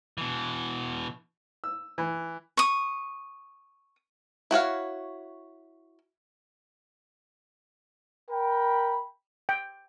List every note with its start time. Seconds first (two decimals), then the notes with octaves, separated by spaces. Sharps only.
0.18 B2 E3
1.64 E6
1.98 E3
2.57 C#6 D#6
4.51 E4 F#4 C#5 F5
8.31 A#4 G5 B5
9.49 G5